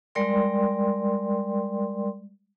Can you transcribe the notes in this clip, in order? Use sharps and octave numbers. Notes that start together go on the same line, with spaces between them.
G3 G#3 A#4 D5 G5 C6